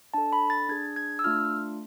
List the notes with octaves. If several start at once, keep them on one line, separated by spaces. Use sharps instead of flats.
D4 A4 A5
B5
A6
D4 G#4 G#6
G#6
E6
A3 D4 F4 F6